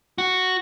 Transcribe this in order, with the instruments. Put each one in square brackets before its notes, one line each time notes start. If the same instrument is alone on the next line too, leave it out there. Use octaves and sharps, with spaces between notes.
[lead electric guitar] F#4